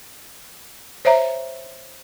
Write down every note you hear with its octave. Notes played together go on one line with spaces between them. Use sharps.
C5 C#5 E5 A#5